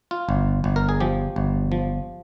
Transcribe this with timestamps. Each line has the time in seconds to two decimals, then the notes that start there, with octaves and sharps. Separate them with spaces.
0.11 F4
0.29 G1
0.64 G1
0.76 A#4
0.89 G#4
1.00 F3 G4
1.36 G1
1.72 F3